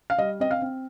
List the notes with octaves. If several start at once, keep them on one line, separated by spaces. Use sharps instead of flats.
F5
G3 D#5
C4 D#5
F5
C4